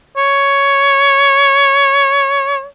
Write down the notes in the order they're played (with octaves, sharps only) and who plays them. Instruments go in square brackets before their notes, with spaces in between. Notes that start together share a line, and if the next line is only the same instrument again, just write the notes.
[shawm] C#5